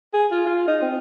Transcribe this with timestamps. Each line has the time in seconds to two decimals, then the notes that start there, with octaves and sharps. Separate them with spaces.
0.14 G#4
0.31 F4
0.46 F4
0.67 D#4
0.82 C4